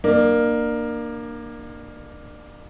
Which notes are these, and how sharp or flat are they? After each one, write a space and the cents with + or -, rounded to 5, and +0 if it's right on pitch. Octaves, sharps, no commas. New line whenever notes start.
A#3 +5 D4 +35